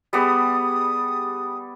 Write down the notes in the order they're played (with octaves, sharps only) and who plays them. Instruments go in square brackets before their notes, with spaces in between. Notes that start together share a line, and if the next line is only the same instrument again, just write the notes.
[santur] G3 B3 G#4 [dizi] D#6